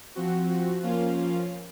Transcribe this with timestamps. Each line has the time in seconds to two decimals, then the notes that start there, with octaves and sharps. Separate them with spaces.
0.15 F3 C4 F#4
0.50 F#4
0.83 F3 A#3 C#4 F4
1.17 F4